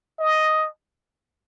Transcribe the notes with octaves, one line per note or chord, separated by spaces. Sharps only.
D#5